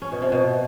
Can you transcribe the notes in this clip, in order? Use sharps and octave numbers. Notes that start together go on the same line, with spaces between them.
C#4
B2
C3
B2